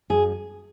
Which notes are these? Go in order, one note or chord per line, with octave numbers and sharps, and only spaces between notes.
F#2 G#4